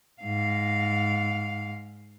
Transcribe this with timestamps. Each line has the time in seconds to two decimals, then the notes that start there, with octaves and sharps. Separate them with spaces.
0.22 G#2 F5